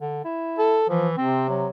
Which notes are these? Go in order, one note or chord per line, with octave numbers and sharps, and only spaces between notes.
D3
E4
A4
E3 F3
C3 C4
F#3